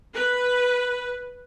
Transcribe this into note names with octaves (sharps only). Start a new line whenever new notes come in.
B4